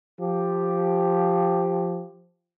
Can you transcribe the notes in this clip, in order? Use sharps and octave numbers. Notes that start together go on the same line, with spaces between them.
F3 G4